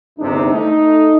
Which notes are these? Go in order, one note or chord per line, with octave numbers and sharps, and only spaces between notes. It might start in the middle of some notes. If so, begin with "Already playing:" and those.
G1 E2 C3 D4 D#4
A3 D#4